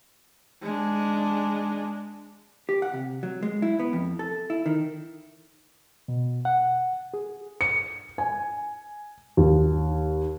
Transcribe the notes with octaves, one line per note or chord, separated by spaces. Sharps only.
G#3 D4
G4
F#5
C3
F#3
G#3
E4
B3
F2
A4
E4
D#3
B2
F#5
G#4
C#7
G#5
D#2